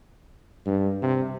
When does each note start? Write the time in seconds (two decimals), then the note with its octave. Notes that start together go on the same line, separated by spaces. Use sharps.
0.66 G2
1.02 C3